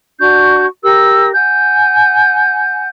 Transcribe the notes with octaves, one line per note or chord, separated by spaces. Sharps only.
D4 F#4 C#6 G6
G4 A#4 E6
F#5 G#5 G6